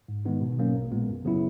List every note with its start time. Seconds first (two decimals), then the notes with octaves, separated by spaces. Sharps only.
0.09 G#2
0.25 D#3 G#3 B3 D#4
0.41 B2
0.58 F#3 A#3 C#4
0.75 A#1
0.92 A#2 G#3 B3
1.09 F#2
1.25 C#3 F#3 B3 E4